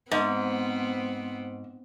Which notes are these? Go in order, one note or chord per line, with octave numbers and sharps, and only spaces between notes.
G#2 B3 C4